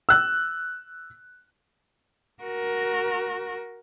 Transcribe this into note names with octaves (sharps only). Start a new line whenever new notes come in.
E6 F#6
F#4 A#4